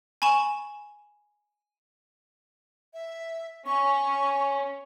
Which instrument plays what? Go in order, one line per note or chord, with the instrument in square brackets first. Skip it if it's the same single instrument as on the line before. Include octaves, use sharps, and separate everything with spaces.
[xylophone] G#5 B5 C#6 E7
[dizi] E5
[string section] C#4 [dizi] C#6